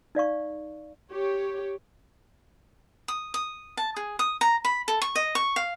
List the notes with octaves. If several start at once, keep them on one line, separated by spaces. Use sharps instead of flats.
D#4 D5 F5 C#6
G4 C#5
D#6
D#6
A5
G#4
D#6
A#5
B5
A4
C#6
D#5
C#6
F5